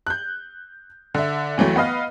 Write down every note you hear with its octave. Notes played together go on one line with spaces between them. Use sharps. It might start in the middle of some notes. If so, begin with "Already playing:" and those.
F#6 G6
D3 E5
D#2 E3 F#3 A3
B3 B4 D#5 F5